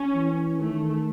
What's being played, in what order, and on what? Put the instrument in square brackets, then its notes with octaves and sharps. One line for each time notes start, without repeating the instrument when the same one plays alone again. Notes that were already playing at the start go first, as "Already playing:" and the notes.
Already playing: [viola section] C#4
[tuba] E3
[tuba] D#3 [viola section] A3